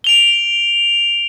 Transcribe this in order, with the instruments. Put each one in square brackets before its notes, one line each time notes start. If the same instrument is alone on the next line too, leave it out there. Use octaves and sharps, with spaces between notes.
[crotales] D7 F7 G7